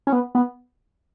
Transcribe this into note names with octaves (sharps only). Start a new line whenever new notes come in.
C#4
B3
B3